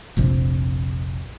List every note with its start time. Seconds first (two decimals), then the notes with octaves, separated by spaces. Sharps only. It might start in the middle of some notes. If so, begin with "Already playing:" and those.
0.17 F1 A#1 C3